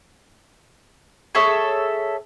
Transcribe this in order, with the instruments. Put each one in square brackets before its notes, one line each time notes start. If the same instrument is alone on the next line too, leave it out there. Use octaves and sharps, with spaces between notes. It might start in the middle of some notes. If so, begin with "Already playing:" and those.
[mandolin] G#4 A4 C#5 E5